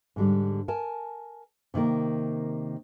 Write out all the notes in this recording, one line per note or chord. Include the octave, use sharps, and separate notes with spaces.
G#2 D3 G3
A#4 G#5 A5
C3 D#3 A#3 A#4